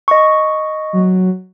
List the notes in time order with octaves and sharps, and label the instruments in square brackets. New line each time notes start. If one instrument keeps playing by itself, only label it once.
[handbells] D#5 C#6
[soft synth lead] F#3